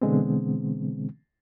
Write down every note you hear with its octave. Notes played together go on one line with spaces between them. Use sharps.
B2 D3 E3 G#3 B3 C4